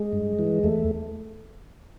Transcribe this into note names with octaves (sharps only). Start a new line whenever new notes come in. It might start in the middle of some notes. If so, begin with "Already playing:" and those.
Already playing: G#3
G2
E3
E2 A3